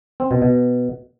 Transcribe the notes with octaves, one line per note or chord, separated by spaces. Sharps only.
C4
B2
B2